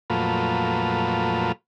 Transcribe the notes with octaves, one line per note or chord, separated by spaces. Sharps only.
F2 A#2 F#3 A3 F4 B4